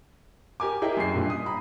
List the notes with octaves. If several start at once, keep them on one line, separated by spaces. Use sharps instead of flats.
G4 A#4 G#5 D6
E4 G4 G#4 A#4 D#5 G5
F#2 C7
G2 A#2
D#6
A#5 B5